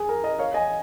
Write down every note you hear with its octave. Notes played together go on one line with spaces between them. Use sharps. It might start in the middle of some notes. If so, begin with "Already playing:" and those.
Already playing: G#4
A#4
A#4 D#5
C#5 F5
D#5 G#5